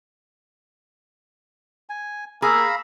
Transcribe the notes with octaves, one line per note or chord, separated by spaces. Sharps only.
G#5
A#3 G#4 F5 A#5 B5 E6